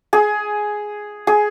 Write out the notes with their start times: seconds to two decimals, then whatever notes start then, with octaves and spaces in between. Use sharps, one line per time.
0.13 G#4
1.27 G#4